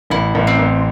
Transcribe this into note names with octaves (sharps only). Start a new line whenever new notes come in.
A1 E4
A1
C4
A1